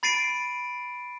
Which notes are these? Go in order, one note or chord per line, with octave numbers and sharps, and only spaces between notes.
B5 A6 C7 D7 D#7